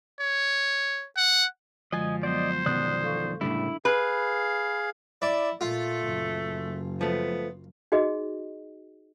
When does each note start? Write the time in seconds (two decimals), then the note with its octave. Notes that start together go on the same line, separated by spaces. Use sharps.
0.21 C#5
1.17 F#5
1.92 F#2 D3 F3 G#3 D#5 G#5
2.23 F#3 B3 C5 D5 D#5
2.66 B2 D#3 F3 D5 D#6 F#6
3.03 A4 F5 C#6
3.41 A2 C#3 G3 D4 E4
3.85 G#4 B4 F5
5.22 E4 D5
5.61 A#2 A3 F4
6.02 F#1
7.01 F3 A3 B3
7.92 D#4 F#4 G#4 D#5